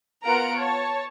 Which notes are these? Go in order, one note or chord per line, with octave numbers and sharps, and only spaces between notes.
B3 F4 A#4 F#5 A#5 D7
C#5 A5